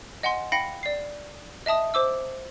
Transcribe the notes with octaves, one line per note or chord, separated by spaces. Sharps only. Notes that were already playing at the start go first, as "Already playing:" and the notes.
D#5 F#5 G#5 C6
F5 G5 B5 A#6 C#7
D5 C7
D#5 E5 A5 D#6
C5 D6 E6